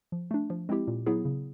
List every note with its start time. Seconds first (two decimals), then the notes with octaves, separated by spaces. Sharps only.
0.12 F3
0.31 A3 D4
0.50 F3
0.69 G#3 C4 E4 G4
0.87 A#2
1.06 F#3 B3 E4 G#4
1.25 C#3